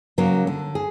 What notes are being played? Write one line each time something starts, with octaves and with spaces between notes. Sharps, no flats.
C#3 F#3 A#3 C#4
D3
G#4